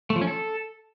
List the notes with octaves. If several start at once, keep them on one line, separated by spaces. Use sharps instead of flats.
A3
F3
C#4
A4